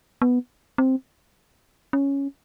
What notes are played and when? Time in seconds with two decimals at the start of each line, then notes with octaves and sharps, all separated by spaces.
0.22 B3
0.78 C4
1.93 C#4